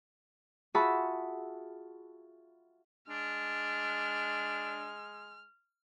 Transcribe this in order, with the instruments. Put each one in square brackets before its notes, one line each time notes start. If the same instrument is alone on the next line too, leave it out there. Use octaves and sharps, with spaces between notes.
[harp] F4 F#4 G#4 E5 A5 B5
[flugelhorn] G#3 [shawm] D4 [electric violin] F6